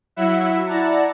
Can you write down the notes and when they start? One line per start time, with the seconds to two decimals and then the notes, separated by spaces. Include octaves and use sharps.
0.16 F#3 E4 E5 F#5
0.66 E4 D5 F#5 A5 A#5